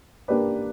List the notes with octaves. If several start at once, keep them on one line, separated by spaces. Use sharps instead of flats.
A#3 D4 G4 B4 D5